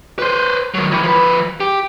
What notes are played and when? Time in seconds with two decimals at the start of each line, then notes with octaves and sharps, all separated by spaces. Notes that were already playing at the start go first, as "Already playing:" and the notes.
0.19 B4 C5
0.74 D#3 F#3
0.92 D#3 E3
1.03 F3 B4
1.60 G4